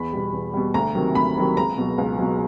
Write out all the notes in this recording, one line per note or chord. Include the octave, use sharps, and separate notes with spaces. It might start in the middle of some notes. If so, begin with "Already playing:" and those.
Already playing: E2 B5
B2 G3
E2
B2 G3
D2 A#5
C3 D#3 F#3
D2 B5
C3 D#3 F#3
C#2 A#5
B2 F#3
C#2
B2 F#3